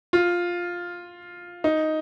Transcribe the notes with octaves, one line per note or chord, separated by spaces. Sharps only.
F4
D#4